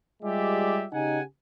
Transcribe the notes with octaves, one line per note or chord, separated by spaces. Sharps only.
G3 G#3 F4 G4 D5 E5
C#3 D#4 G4 F#5 G#5